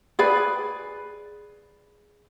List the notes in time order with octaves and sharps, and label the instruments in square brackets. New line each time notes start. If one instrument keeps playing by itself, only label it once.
[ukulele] G#4 B4 D5 B5